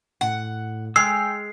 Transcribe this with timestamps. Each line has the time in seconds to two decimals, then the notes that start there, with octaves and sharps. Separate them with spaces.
0.21 A2 F#5
0.96 G#3 G5 E6 F6 C7